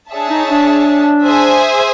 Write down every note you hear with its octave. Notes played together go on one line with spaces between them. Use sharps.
D4 G#4 C#5 E5 A5
D#4
D#4
D4
G#4 C5 E5 G#5